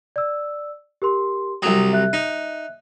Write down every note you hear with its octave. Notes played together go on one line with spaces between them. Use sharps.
D5 E6
G4 A#4 C6
C2 F#3 D#6
E5 F#6
D#4